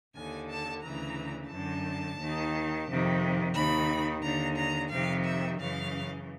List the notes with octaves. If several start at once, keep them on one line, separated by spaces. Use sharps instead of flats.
D#2 D3 G#5
A5
D2 C#3 E3 A#5
F#2 D3 A5
D#2 D#3
F2 C3 D#3
D#2 D#3 B5
D#2 D3 A#5
A#5
F2 C3 D#3 F5
E5
F#2 C#3 E3 F5